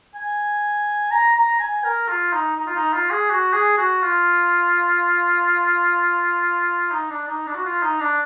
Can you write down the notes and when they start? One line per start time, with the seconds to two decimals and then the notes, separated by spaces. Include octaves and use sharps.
0.15 G#5
1.11 A#5
1.36 A#5
1.60 G#5
1.84 A#4
2.09 F4
2.33 D#4
2.57 D#4
2.66 F4
2.76 D#4
2.94 F4
3.11 G#4
3.30 F#4
3.53 G#4
3.78 F#4
4.02 F4
6.92 D#4
7.10 D4
7.27 D#4
7.47 D4
7.55 F#4
7.65 F4
7.83 D#4
8.00 D4